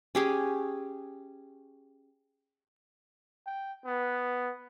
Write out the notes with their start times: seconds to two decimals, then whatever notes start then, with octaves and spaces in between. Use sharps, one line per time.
0.15 C#4 G4 G#4
3.47 G5
3.85 B3